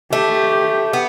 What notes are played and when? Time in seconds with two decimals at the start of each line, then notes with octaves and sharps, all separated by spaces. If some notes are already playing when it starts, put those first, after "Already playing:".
0.12 A3 G4
0.93 B3